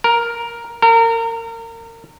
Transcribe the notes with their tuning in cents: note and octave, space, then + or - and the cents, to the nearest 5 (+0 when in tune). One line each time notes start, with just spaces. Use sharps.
A#4 +5
A#4 -30